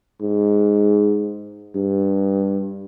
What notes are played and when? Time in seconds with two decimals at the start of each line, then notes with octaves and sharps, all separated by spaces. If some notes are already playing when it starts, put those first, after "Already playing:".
0.21 G#2
1.75 G2